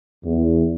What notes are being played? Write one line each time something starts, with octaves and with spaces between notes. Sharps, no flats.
E2